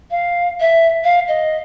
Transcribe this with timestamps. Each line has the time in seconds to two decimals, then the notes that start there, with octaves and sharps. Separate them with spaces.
0.10 F5
0.60 E5
1.04 F5
1.27 D#5